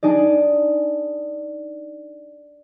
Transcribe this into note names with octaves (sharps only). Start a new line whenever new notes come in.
D4 D#4 G#4 D5